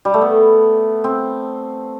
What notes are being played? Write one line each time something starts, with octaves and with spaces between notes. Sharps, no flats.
G3
A3
B3
C4